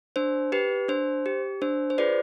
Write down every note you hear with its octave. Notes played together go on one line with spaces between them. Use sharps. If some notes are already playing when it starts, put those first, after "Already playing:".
D4 C5
G4 B4
D4 C5
G4
D4 C5
C5
F4 G#4 B4 D5